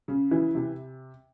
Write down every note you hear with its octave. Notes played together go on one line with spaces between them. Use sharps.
C#3
E3
C3